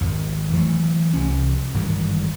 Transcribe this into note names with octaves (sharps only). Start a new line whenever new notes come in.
G#1 F2
E3 F#3 A3
C2 F3 C#4
G#1 G2 E3